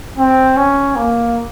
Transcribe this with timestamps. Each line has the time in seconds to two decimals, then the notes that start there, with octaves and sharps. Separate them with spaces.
0.18 C4
0.56 C#4
0.95 A#3